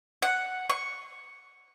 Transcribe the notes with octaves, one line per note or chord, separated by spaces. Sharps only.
F#5
C#6